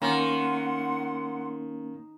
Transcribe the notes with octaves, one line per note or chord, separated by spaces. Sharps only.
D#3 A#3 C#4 F#5 C6